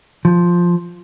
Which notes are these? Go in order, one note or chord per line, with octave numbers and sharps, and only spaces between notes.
F3